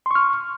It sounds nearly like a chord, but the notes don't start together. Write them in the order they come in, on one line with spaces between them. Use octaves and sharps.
C6 C#6 F6